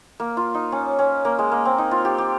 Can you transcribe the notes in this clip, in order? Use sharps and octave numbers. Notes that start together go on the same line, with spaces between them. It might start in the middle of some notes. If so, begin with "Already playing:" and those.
A#3
F4
D#4
C#4
C#4
A#3
G#3
A#3
C4
D#4
F4
G4
G4